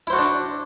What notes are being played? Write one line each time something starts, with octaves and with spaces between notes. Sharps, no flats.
D4 E4 F#4 A4 C5